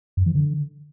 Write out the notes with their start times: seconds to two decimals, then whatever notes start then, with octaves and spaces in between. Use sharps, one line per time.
0.17 F#2
0.26 E3
0.35 D3